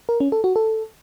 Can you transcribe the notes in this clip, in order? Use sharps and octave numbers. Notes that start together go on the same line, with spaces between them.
A#4
C#4
A4
F#4
A4